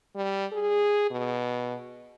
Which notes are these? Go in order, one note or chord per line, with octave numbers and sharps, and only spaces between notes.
G3
G#4
B2